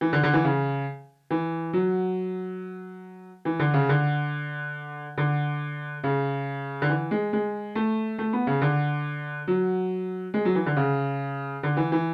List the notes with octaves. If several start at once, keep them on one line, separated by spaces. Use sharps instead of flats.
E3
D3
D3
E3
C#3
E3
F#3
E3
D3
C#3
D3
D3
C#3
D3
E3
G#3
G#3
A3
A3
B3
C#3
D3
F#3
G#3
F#3
E3
D3
C#3
D3
E3
E3